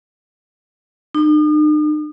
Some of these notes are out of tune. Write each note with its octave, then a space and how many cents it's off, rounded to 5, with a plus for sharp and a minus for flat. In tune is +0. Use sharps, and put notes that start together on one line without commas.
D#4 -45